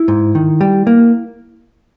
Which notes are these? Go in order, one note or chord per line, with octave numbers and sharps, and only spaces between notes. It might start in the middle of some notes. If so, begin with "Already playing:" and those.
Already playing: E4
G#2
D#3
G3
A#3